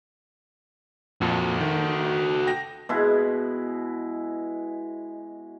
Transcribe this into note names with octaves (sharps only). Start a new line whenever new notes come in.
F2 A#2 F#4 A4
D#3
G5 A#6
B2 G#3 E4